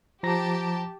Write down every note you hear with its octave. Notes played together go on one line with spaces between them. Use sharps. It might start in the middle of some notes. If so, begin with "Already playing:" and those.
F3 G4 A5 A#5 A#6